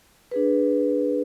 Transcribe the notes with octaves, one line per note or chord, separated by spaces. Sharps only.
D4 G#4 B4